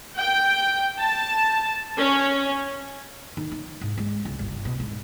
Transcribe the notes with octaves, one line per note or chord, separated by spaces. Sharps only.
G5
A5
C#4
D#3
D#4
G#2
G#3
C#2
G1
B2
G#2